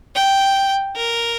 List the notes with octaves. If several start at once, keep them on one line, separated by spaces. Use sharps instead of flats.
G5
A#4